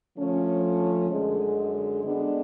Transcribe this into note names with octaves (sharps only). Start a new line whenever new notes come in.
D3 F3 A3 C#4
F#2 D3 G#3
D3 G#3 B3 D4